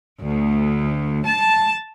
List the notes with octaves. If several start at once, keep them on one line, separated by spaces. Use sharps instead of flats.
D2
A5